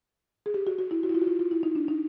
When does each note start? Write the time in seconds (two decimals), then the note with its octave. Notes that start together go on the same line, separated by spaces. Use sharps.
0.46 G#4
0.54 G4
0.67 F#4
0.78 F#4
0.91 E4
1.03 F#4
1.10 E4
1.14 F4
1.22 F#4
1.27 F4
1.39 F4
1.51 E4
1.63 D#4
1.75 D4
1.88 D#4